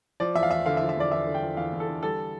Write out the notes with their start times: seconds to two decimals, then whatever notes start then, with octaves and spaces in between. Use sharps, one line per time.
0.20 F3 D5
0.35 E2 E5
0.43 F5
0.51 E2 E5
0.66 D3 F5
0.77 E5
0.81 F3
0.89 E5
0.96 E2 D5
1.12 E2 E5
1.27 D3
1.34 G5
1.42 F3
1.57 E2 F5
1.72 E2
1.80 A4
1.88 D3
2.03 G3 A4